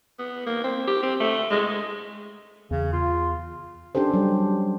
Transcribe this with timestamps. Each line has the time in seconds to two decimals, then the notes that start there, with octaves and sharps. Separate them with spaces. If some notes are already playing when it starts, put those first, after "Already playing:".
0.19 B3
0.47 A#3
0.64 C4
0.87 G4
1.02 C4
1.20 A3
1.51 G#3
2.71 E2 C#3
2.93 F4
3.95 C#4 D4 G4 A4 C5
4.14 F#3 G3